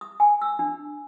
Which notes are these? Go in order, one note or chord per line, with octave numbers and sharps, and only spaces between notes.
D#6
G#5
E6
D4